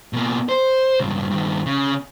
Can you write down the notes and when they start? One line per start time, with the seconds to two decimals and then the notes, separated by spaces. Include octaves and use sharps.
0.13 B2 A#3
0.49 C5
1.00 C#2 G2
1.31 G2 D#3
1.66 C#3